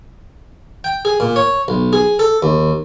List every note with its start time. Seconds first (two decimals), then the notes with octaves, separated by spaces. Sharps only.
0.84 G5
1.05 G#4
1.20 A#2
1.36 C#5
1.68 B1
1.93 G#4
2.19 A4
2.43 D#2